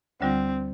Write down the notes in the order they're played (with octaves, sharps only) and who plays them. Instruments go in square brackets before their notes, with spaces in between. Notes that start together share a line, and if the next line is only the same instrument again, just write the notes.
[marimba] D2 D3 G3 D4 F4 [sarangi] C4